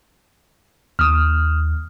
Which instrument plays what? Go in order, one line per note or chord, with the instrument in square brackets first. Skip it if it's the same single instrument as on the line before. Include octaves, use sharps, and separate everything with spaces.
[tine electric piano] D#2 [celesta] D#6 F6